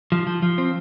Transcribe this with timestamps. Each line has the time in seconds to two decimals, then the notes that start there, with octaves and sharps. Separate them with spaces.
0.12 F3
0.27 F3
0.42 F3
0.58 C4